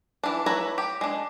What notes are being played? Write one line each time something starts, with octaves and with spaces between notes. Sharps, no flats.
E3 D4
A3 E4 B4 C#5 A#5
G4
G#3 D4